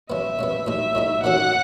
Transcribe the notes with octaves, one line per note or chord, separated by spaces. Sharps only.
C#3 G#3 B3 E5
C#3 G#3 B3
A2 G#3 D#4 E5
A2 G#3 D#4
D#3 A3 C#4 F#4 F#5